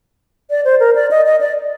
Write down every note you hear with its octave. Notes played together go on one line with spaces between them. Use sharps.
D5
C5
A#4
D5
D#5
D#5
D5